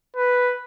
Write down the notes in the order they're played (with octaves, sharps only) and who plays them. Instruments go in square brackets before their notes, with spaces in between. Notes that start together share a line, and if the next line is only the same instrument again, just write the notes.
[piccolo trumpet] B4